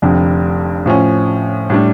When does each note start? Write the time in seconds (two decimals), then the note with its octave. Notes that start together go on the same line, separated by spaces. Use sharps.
0.02 F1 F2 D3
0.86 A2 F3 C#4
1.70 A2 G3 D4